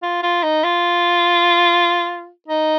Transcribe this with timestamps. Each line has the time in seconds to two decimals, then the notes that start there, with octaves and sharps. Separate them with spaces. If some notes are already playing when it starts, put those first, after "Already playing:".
0.03 F4
0.23 F4
0.43 D#4
0.64 F4
2.49 D#4